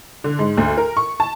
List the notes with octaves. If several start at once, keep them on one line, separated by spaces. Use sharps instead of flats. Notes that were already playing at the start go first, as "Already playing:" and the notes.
D3
G#2
D2
A#4
C#6
A5